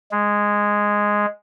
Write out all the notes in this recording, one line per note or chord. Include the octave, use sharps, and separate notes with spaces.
G#3